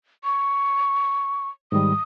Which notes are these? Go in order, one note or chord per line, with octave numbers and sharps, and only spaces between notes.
C#6
G#2 D#3 G3 D#6